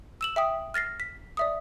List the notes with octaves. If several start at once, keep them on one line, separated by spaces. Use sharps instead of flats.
E6 E7 F#7
E5 G5 D#6
F6 A6 A#6 C7
B6
D5 E5 D#6